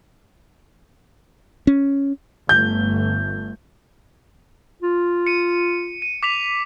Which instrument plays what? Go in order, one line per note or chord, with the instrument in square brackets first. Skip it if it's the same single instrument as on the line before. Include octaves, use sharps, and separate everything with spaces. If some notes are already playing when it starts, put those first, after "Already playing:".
[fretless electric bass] C#4
[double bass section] G1 A3 [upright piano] G6
[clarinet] F4
[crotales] C#7 D#7
D#7
D6 B6 F7